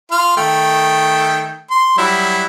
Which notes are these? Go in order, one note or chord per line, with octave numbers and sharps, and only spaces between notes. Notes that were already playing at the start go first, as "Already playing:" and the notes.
F4 F5
D#3 A3 G5
C6
F#3 G3 E4